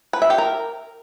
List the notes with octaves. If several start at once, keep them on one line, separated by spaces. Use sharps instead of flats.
B4
E5
G4
A#4